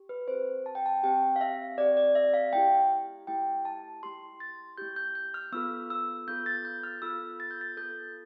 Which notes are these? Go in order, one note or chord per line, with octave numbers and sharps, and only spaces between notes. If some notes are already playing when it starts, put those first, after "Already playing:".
Already playing: G4
B4
C4 G4 C5
A5
G5
A5
C4 G4 G5
F5
E5
C4 G4 D5
D5
E5
F5
A3 E4 G4 G5
A3 E4 G4 G5
A5
A3 E4 G4 C6
A6
A3 E4 G4 G6
G6
G6
F6
B3 F4 A4 E6
E6
B3 F4 A4 G6
A6
G6
F6
B3 F4 A4 E6
A6
G6
A6
B3 F4 A4 G6